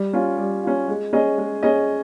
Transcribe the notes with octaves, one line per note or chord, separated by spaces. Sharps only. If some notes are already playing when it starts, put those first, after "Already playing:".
Already playing: G3
C#4 F4
G3
C#4 F4
G#3
C#4 G#4 D#5
G#3
C#4 G#4 D#5